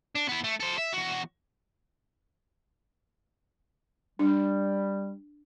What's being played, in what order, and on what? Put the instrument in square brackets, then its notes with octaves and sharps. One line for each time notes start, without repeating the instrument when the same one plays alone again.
[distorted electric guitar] D4
B3 E4
A3
A4 C5
E5
E2 F#4
[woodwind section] G3 [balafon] D4